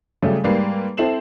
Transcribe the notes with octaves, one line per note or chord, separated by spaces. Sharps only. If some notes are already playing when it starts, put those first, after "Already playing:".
C#3 F#3 G3 A3
G#2 G3 A#3 B4 C7
C4 E4 A4 C7 E7 F#7